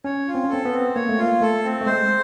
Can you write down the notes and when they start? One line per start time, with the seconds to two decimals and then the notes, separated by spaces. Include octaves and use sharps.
0.04 C#4 C#5
0.27 F4
0.35 C4
0.44 C#4
0.49 C4 A4
0.65 B3
0.72 C4
0.95 A#3 C#5
1.09 A3
1.18 A#3 F4
1.41 A3 A4
1.64 C4
1.81 A3
1.86 G#3 C5